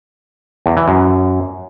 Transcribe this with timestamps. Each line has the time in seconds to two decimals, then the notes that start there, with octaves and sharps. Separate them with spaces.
0.66 E2
0.77 E3
0.88 F#2